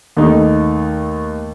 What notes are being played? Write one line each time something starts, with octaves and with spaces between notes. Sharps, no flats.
D#2 A3 D#4